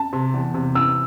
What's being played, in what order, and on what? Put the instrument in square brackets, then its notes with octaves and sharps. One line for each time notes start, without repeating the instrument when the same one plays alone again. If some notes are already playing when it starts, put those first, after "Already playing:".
Already playing: [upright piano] A5
[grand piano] C3
E2
C3
[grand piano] E3 [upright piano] E6